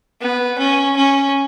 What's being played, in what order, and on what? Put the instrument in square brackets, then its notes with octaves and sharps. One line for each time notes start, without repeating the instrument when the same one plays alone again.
[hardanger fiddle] B3
C#4
C#4